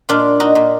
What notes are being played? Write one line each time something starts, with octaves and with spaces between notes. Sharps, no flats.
A#2 D4 F4
D#4 F#4
A#2